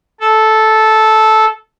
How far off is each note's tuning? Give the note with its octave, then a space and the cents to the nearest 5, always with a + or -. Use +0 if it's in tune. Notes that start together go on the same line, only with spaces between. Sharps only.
A4 -10